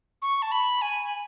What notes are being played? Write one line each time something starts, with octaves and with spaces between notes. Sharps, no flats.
C#6
A5
B5
G#5